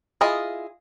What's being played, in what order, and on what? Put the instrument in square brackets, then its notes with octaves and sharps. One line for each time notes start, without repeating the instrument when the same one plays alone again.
[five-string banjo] E4 F4 G#4 D#5